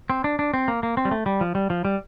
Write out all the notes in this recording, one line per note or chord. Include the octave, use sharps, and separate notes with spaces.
C4
D4
D4
C4
A#3
A#3
C4
G3
A3
G3
F3
G3
F3
G3